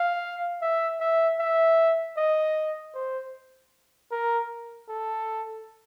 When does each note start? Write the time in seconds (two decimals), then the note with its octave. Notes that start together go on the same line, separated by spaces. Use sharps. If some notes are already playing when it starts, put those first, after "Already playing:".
Already playing: F5
0.62 E5
1.01 E5
1.39 E5
2.17 D#5
2.94 C5
4.11 A#4
4.89 A4